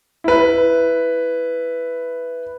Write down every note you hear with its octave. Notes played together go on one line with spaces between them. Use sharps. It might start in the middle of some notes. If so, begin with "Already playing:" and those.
E4 B4